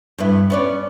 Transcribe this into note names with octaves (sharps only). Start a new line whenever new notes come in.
G2 B3 E4
B3 C#4 D5